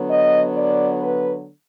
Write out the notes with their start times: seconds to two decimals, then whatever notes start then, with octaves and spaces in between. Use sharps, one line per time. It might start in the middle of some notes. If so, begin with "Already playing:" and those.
Already playing: D3 F#3 B3
0.10 D#5
0.56 D5
1.01 B4